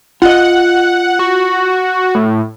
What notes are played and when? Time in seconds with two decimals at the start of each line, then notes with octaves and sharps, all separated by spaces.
0.22 F4 D#5 F#5
1.19 F#4
2.15 A2